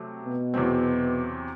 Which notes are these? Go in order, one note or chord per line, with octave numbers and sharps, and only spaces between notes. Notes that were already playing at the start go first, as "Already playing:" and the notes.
Already playing: C3 F#3 A3
B2
E2 C3 F#3 C4